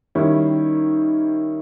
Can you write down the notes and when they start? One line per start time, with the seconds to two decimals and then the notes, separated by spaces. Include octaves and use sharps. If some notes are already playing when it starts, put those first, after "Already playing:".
0.15 D#3 G3 C#4 E4